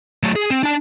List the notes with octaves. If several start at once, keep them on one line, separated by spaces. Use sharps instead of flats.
F#3 A3
G#4
C4
D4 A5